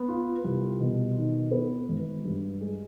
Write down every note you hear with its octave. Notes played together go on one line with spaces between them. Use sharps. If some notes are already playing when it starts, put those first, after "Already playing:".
Already playing: B3
F4
C2
B2
D#3
B3
G#1
G2
G#3